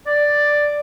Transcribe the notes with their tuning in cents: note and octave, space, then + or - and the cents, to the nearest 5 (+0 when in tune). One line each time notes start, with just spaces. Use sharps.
D5 +5